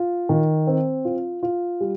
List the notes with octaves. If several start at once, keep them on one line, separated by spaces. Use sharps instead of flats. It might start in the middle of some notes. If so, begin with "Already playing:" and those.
Already playing: F4
D#3
C4
F4
F4
G3